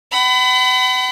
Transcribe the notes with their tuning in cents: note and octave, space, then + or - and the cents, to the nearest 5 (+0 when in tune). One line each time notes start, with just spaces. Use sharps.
F#5 +40 B5 +30